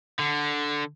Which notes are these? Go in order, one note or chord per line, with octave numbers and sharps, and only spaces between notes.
D3